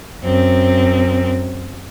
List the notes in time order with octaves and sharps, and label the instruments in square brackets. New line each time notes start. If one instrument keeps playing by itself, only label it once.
[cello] F#2 C4